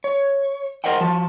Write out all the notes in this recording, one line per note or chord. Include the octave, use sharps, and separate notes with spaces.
C#5
A#4 C5 D#5 F#5 G5
F3 F#4 A5